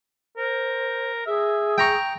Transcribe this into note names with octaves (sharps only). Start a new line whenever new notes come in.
A#4 C5
G#4 E5
G5 A#5 C#6